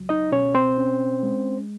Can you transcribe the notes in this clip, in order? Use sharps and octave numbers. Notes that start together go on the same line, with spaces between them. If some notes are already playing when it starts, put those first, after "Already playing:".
Already playing: C#2 F#3
D#4 D#5
B2 C#4 C#5
C4 C5
C#4
G#3